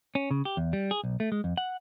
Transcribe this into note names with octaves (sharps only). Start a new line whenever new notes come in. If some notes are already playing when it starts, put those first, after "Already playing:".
C#4
C#3
G4
E2
G3
G#4
B1
A3
G#3
F2
F#5